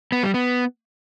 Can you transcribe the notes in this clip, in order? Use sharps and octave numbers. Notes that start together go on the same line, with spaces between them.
B3
G3
B3